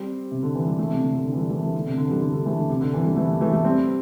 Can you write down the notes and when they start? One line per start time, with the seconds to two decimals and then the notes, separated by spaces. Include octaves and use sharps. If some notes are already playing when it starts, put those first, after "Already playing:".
Already playing: G3 C4
0.31 C3
0.43 D3
0.55 E3
0.67 G3
0.78 E3 A3
0.91 C3
1.02 D3
1.15 D3
1.26 D3
1.33 E3
1.38 D3 G3
1.50 E3 A3
1.62 E3 A3
1.74 D3
1.86 C3
1.98 D3
2.06 E3
2.10 D3 G3
2.22 D3
2.33 D3
2.46 E3 A3
2.58 D3
2.70 C3
2.81 D3
2.94 C3 E3
3.05 D3 G3
3.17 E3 A3
3.41 E3 A3
3.53 E3 A3
3.65 G3 C4